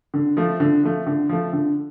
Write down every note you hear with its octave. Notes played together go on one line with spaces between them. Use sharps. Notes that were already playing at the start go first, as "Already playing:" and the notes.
D3
F3 A3
D3
F3 A3
D3
F3 A3
D3